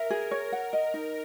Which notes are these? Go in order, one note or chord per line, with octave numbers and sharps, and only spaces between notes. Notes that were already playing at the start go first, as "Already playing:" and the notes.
Already playing: A#4 E5
G#4
C#5
F#5
D#5
D#4